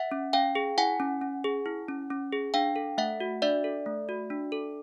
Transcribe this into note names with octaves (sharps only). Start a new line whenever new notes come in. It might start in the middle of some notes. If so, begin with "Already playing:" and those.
Already playing: E5 F#5
C#4
C#4 F5 G5
G#4
E4 F#5 G#5
C#4
C#4
G#4
E4
C#4
C#4
G#4
D4 F5 G5
A4
A3 E5 F#5
F#4
D4 D5 E5
A4
A3
F#4
D4
A4